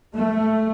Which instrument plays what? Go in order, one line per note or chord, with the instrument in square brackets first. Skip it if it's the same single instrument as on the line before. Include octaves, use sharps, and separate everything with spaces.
[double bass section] A3